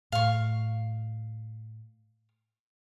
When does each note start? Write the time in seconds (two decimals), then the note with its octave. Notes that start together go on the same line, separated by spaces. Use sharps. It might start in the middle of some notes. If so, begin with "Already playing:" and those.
0.12 A2 F5 C#6